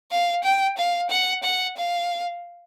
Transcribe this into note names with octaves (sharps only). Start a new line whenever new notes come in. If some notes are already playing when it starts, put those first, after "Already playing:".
F5
G5
F5
F#5
F#5
F5